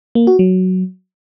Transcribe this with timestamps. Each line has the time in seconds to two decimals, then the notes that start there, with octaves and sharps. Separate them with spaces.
0.15 A#3
0.27 F#4
0.39 F#3